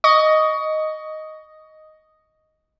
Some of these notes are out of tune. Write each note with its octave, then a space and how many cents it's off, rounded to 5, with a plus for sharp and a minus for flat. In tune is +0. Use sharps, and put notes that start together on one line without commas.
D#5 +0 C#6 +25